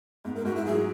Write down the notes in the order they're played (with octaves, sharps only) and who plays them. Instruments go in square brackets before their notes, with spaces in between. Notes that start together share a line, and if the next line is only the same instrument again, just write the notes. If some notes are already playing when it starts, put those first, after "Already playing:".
[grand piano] G#2 [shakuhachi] B3
[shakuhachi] A#4
[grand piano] G#2 [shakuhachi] F#4
[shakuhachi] E4
[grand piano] F#3 [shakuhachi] G#4